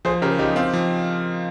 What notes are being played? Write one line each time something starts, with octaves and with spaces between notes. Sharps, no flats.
F3 G#4 C5
C#3 G4 A#4
F3 D#4 G4
C4 F4
F3